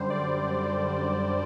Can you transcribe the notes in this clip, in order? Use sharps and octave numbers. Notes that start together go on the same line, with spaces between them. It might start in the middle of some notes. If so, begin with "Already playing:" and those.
Already playing: F#2 D3 G3 C5
F#2 D5
G3
F#2
D3